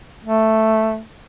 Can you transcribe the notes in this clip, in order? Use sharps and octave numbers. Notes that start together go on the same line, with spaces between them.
A3